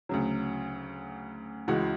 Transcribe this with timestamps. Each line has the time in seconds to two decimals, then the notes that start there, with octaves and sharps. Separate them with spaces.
0.09 D2 C#3 F#3
1.68 C#2 C#3 E3 G#3 F#4